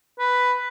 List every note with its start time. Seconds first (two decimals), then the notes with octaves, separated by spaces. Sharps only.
0.19 B4